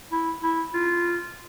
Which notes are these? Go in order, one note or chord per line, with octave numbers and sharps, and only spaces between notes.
E4
E4
F4